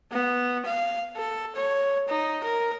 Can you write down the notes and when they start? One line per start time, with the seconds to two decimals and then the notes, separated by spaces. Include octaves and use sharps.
0.12 B3
0.66 F5
1.17 A4
1.56 C#5
2.08 D#4
2.44 A#4